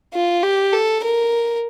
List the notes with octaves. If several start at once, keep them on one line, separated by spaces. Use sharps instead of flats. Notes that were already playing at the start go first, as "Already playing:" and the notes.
F4
G4
A4
A#4